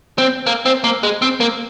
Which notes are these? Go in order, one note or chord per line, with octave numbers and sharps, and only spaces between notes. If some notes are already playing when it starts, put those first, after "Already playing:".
C4
A#3
C4
A#3
G#3
C4
A#3